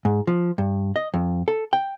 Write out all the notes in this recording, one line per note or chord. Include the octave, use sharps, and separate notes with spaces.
G#2
F3
G2
D#5
F2
A4
G5